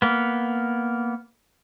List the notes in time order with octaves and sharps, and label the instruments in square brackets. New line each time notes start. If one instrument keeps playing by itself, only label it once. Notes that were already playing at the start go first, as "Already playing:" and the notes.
[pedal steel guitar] A#3 B3